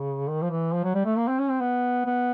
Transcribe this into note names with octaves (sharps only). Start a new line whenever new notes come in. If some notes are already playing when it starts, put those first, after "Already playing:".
Already playing: C#3
D#3
F3
E3
F3
F#3
G3
A3
A#3
C4
C#4
C4
B3
B3